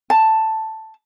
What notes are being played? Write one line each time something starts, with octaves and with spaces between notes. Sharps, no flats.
A5